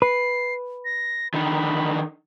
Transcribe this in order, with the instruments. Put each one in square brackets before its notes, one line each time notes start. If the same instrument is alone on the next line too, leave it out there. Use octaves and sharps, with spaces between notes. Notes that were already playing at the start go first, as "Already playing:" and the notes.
[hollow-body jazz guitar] B4 [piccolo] C7
[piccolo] A#6
[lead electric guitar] D3 D#3 [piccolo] B5